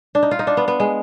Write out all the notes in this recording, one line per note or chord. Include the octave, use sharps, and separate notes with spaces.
D4
D#4
F4
D#4
D4
B3
B3
G#3